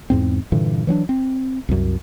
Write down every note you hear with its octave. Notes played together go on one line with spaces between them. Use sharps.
E2 G#2 C4
G2 A#2 D3 E3
E3 F#3 C4 D4
C4
C2 F#2